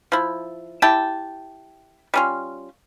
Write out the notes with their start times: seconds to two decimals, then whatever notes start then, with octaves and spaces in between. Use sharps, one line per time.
0.12 F3 E4
0.82 E4 G4 G5 A5
2.14 G3 C#4 F4